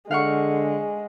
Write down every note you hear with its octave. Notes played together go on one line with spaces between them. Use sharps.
D3 G#3 G#4 F5 F#5 C#6